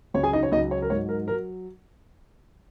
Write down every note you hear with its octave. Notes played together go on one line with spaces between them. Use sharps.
C#2 C#3 F#3 C#5
G#4 G#5
D#4 D#5
C#5
C#2 C#3 F#3 D#4 D#5
C#5
A#4
G#2 F#3 C#5
A#4
A#4
F#3